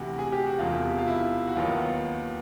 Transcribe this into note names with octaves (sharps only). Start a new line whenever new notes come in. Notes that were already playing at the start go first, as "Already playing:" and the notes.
Already playing: D2 C3 E3 F#4
G#4
G4
F#4
E1 E2 C3 F4
F4
E4
F#4
D#2 D#3 F#3 B3 F4